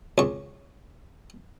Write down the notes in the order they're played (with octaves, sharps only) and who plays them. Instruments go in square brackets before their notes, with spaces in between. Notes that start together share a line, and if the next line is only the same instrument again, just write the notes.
[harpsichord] C#2 C#6